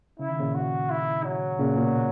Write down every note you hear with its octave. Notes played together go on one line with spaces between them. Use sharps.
C#3 E4
D#3
A#2 C#3
F#4
E4
F#3
A#2 C#3
A#2
B2